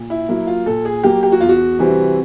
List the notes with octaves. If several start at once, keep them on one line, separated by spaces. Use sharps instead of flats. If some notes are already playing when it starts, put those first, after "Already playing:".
Already playing: A#2
E4
F#3 A#3 E4
F4
A#2 A4
G#4
F#3 A#3 G4
G4
F#4
E2 F4
F#4
C3 E3 G3 C4